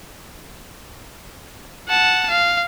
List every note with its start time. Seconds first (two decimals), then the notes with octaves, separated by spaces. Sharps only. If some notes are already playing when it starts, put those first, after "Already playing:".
1.88 F#5 A5
2.30 F5